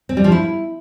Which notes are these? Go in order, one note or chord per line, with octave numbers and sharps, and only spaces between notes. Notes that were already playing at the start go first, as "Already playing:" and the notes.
C4
G3
F3
E4